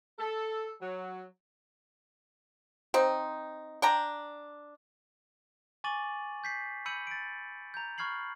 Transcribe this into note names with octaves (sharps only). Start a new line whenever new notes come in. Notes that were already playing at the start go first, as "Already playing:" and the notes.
A4
F#3
C4 D#4
D4 G5 A#5
G#5 C#6 D6 A6 D#7 F#7
G6 B6 C7
B5 E6 G6 C#7 D#7 F#7
A6 D7
A#5 G6
B5 C#6 F6 G#6 C7 F#7